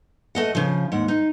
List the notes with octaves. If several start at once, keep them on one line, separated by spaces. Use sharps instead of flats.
A3 D#5 F#5
C#3 F3
D#2 G#2 F#5
D#4